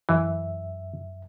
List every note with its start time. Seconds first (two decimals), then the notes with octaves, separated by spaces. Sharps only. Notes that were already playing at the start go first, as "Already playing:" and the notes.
0.09 F#2 E3 E5